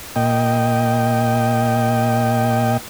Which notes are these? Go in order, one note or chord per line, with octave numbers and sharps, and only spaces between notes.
A#2 D#5 G5